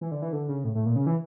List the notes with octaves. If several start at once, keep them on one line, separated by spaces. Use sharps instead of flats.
E3
D3
E3
D3
C#3
A2
A2
A#2
C#3
E3